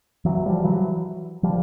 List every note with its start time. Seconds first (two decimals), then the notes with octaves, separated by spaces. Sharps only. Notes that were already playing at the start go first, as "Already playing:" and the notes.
0.25 E3 F#3
0.46 F3 G3
0.65 E3 F#3
1.43 F3 G3